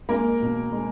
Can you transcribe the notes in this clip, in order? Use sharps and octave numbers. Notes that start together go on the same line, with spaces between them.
G#3 A#3 A#4
B2
G#3